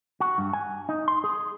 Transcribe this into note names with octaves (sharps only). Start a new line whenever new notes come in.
F#4
G2
G#5
D#4
C6
G#4